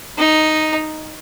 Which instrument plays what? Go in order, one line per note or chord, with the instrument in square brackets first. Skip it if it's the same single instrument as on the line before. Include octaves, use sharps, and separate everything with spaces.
[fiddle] D#4